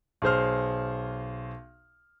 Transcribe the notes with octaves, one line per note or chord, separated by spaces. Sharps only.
B1 G#4 C5 F6